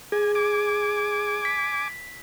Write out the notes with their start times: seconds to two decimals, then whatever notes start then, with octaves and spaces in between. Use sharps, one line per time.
0.12 G#4 G#5
0.35 G#5 D6
1.45 B6